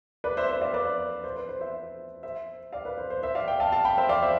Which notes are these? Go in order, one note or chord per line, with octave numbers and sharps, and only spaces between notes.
B4 D5
C5 E5
C5 E5
D5 F5
B4 D5
C5
B4
C5
C5 E5
C5 E5
D5 F5
B4
C5
C5
C5 E5
D5 F5
E5 G5
F5 A5
F5 A5
G5 B5
C5 E5
D5 F5
C5 E5